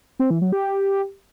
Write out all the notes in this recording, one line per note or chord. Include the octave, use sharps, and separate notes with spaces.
C4
E3
F#3
G4